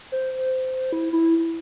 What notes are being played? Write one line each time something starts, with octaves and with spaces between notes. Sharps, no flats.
C5
E4
E4